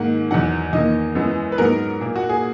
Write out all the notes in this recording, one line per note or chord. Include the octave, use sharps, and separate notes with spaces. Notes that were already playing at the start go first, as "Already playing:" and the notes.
Already playing: G#2 D#3 A#3 F#5
E2 D#3 F#3 F#5
E2 D#3 A#3 D#5
F#2 E3 G#3 B3
B4
G#2 F#3 B3 A#4
A#2 A#3
F#4
G#4